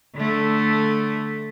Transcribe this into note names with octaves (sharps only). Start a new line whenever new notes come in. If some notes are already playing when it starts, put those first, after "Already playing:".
D3 A3